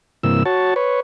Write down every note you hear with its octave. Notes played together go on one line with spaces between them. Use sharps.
G2 C3 E3 A#3 E6
F#4 C#5 A5
B4 C#5